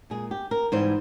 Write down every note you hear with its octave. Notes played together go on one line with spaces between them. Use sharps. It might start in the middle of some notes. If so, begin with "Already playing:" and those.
A#2 G#3 G#4
G4
A#4
G#2 E3 G3 C5